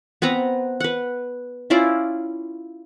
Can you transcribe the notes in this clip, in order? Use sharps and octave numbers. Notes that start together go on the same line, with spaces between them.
B3 C4 B4 A#5
B4 F#5
C#4 E4 F4 D5